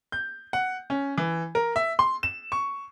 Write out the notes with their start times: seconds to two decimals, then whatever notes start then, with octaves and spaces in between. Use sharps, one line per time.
0.12 G6
0.53 F#5
0.90 C#4
1.18 E3
1.55 A#4
1.76 E5
1.99 C6
2.23 E7
2.52 C#6